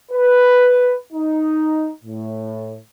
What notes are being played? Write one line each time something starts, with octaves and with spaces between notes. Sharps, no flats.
B4
D#4
A2